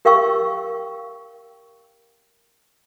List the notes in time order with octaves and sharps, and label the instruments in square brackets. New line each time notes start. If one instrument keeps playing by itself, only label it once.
[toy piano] G4 A#4 F5 G5 C#6 E6